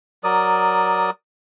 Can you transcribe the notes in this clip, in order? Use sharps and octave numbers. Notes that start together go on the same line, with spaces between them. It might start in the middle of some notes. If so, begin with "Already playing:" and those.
F#3 A#4 D5 D#6